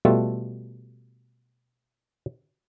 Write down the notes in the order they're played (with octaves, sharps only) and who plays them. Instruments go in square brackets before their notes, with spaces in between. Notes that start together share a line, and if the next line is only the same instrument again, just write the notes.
[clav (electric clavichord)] B2 G3 A3 F4 A4